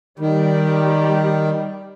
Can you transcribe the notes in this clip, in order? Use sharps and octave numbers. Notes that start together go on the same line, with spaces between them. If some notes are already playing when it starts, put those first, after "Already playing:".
D#3 G3